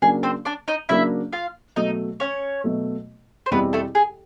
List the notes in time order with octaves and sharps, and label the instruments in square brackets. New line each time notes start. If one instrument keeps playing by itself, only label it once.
[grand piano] C#3 F#3 A#3 D4 [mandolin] G#4
[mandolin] C4 C5
D4 D5
D#4 D#5
[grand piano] C#3 F#3 A#3 D4 [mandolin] E4 E5
[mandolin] F4 F5
[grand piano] B2 F#3 A3 [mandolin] D#4 D#5
[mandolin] C#4 C#5
[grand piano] B2 F#3 A3
[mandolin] C5
[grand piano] E2 B2 G3 C4 E4 [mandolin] B3 B4
[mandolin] A3 A4
G#4